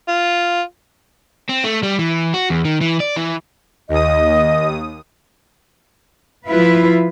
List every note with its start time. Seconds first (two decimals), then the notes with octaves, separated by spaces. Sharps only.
0.09 F4
1.49 C4
1.64 A3
1.83 G3
1.99 E3
2.34 F#4
2.50 E2
2.65 D#3
2.81 E3
3.00 D5
3.16 E3
3.89 D#2 D#5 D#6
6.48 F3 E4 F4 B4